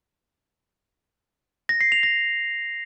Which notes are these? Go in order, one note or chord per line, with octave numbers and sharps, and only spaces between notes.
A#6
C7
F7
A#6